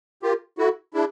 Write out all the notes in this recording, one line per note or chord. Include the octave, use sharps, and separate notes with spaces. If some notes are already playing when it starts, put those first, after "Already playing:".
F4 G4 A#4
E4 F#4 A4
D4 E4 G#4